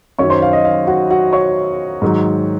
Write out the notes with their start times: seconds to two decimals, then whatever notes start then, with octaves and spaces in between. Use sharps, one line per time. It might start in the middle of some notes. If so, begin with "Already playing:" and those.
0.19 F#2 D#3 F#3 C#5 C#6
0.30 C5 C6
0.42 F5
0.53 D#5
0.65 F5
0.87 F#4 F#5
1.10 F#4 F#5
1.33 C#5 C#6
2.02 G#2 D#3 F#3